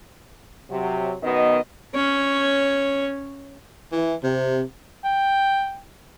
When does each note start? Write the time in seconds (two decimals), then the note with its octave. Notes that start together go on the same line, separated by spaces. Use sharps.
0.70 C3 F#3
1.22 F#2 B2 D#3 B3 D#5
1.95 C#4 C#5
3.93 E3
4.24 C3
5.04 G5